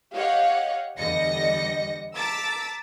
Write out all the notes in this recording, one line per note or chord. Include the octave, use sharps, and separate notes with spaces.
G4 C#5 D#5 F5 F#5
E2 D3 G3 D#5 A#6 C#7
A5 A#5 D6 E6 A6 B6